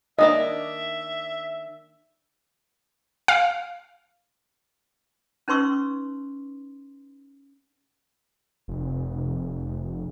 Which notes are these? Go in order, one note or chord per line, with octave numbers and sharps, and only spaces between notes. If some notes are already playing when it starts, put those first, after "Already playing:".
D#3 A#3 D4 D#5 E5
F5
C#4 D#4 B4 C6 C#6 E6
F1